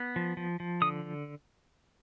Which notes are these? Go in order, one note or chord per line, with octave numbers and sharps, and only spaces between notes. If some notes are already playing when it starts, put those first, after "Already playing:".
Already playing: B3
F3
F3
F3
D3 D#6